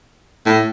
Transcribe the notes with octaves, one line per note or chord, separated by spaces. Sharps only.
A2